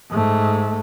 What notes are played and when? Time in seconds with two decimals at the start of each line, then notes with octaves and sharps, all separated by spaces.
0.10 G#2 A3